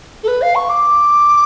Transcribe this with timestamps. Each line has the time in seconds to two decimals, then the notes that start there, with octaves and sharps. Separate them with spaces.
0.23 A4
0.27 B4
0.41 F5
0.55 C#6
0.69 D6